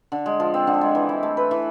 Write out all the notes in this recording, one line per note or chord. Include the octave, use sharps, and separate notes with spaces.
D3
G#3
F3
C4
D3
G#3
E3
E4
A3
B4
E3